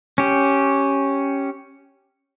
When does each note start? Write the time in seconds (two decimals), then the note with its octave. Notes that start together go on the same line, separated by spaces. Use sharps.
0.18 C#4 G4